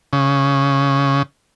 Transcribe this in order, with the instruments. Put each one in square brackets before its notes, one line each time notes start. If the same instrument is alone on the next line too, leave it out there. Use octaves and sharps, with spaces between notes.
[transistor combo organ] C#3